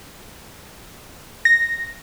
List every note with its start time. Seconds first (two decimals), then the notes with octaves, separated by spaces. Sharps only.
1.45 A#6